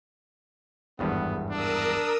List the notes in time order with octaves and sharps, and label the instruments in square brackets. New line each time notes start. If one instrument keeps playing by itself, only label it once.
[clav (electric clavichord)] G#1 E2 G2 [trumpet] B3
[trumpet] D4 [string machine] A#4 D#6 E6